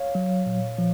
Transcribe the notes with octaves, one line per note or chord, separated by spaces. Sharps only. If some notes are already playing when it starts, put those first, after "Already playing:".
Already playing: C#5 F5
F#3
A#2
F3